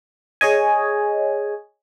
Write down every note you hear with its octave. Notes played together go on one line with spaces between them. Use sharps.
G#4 C#5 D#5 G#5